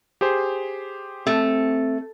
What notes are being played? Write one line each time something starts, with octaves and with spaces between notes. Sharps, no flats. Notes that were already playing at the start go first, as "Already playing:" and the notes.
G4 G#4 C5
A3 C4